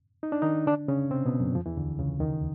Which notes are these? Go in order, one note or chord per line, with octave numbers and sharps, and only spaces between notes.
D#4
D4
D#3 D#4
D3 D4
C#3 C#4
C3 C4
B2 B3
F#2 F#3
F2 F3
E2 E3
D2 D3
C#2 C#3
D#2 D#3